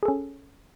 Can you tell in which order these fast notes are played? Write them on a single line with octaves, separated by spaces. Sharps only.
G#4 A4 C#4